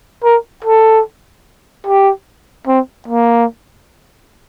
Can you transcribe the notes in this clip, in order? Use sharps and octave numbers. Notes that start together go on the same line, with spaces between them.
A#4
A4
G4
C4
A#3